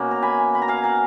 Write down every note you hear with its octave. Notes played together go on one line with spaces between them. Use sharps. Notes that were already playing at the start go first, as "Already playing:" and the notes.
Already playing: B2 A#3 C#4 F#5
A#5
G#5 B5
B5
A#5
F5 G#5
F#5 A#5